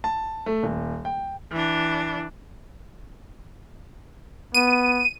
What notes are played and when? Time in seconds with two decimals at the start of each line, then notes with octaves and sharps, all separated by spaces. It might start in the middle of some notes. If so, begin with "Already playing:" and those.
0.04 A5
0.46 A3
0.63 D#1
1.05 G5
1.51 E3 D4
4.54 B3 D#7